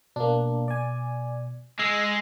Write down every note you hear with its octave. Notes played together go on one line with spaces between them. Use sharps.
B2 A#3 D4
D5 G#5
G#3 E6 C7